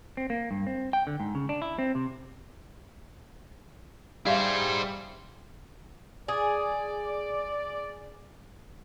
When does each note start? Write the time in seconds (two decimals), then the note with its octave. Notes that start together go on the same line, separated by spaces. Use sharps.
0.17 C4
0.30 A#3
0.51 G2
0.67 C4
0.93 G5
1.07 D3
1.20 G#2
1.35 C#3
1.49 D4
1.62 E4
1.79 C4
1.95 C3
4.26 G3 G#4 C5 E5 F5
6.28 G#4 D5